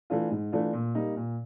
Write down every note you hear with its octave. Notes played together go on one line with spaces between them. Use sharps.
E3 A3 D4 F4
G#2
E3 A3 D4 F4
A#2
G3 A#3 D#4
A#2